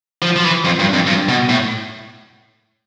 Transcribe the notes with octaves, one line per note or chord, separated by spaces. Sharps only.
F3
F3
E3
F2
G2
F2
G2
B2
A2